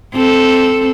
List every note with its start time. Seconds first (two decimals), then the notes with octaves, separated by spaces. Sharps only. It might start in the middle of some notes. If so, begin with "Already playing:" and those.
0.15 C4 A4